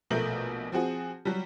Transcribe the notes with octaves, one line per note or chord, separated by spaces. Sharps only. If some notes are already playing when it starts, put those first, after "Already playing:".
A#1 B2 A3 A#4 G6 F#7
F3 C4 F#4 G#4
F#3 G3